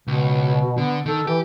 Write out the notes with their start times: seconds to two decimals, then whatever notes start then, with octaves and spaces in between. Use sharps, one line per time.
0.07 C#2 B2
0.78 D3 B3
1.06 D#3 A4
1.27 E3 G4